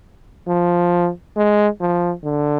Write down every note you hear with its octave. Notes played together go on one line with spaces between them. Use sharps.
F3
G#3
F3
D3